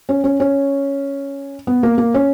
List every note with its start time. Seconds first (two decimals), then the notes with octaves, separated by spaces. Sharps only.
0.09 C#4
0.24 C#4
0.40 C#4
1.67 B3
1.83 A#3
1.98 A#3
2.14 C#4